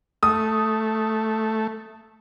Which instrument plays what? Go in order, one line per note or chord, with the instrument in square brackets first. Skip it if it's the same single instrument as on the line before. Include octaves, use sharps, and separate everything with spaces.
[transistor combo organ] A3 [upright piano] D#6